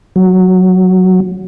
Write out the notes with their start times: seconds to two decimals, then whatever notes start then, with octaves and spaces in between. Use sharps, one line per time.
0.16 F#3